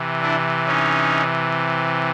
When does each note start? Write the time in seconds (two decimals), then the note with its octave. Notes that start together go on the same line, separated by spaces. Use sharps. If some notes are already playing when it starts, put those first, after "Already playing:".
Already playing: C3 E3
0.22 D4 E4
0.67 C#4 D#4